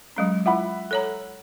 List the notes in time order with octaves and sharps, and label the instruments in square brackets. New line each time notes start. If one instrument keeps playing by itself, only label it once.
[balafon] F#3 G#3 C#4
[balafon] F4 [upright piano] E5 F#5 B5
[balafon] A4 C#5 A#5